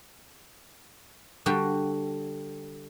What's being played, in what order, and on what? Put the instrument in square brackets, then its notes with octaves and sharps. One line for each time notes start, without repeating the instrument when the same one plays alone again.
[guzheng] D3 G3 F#4 G5